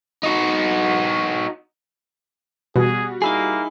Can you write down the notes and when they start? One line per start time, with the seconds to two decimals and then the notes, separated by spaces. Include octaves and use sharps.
0.24 D#4 F#4
2.76 B2 G3 F#4 G#4
3.22 A#3 D#4 E4 G#4